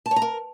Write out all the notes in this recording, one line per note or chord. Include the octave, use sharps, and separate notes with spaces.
A5
C#5
A#5
A#4